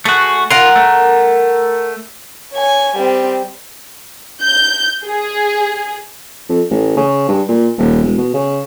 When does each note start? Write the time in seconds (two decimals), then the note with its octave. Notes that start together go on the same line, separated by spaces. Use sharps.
0.05 A3 F#4 G#4
0.51 F4 A#4 F#5
0.76 A3
2.53 C#5 G#5
2.95 G3 C4
4.43 G6
5.07 G#4
6.49 F2
6.70 A1
6.97 C#3
7.28 G2
7.48 A#2
7.78 D#1
8.03 E1
8.18 B2
8.34 C#3